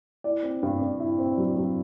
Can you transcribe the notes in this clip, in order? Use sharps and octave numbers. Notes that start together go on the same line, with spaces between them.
E4 D5
C4
G2
G2
E4
C4
F#3
F#3